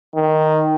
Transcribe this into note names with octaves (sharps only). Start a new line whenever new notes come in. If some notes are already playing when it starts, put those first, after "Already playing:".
D#3